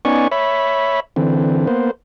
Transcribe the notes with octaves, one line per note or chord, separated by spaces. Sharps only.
B3 C#4 D#4 D5 G#5 C#6
C#5 E5 B5
D3 E3 C4
A#3 B3 C5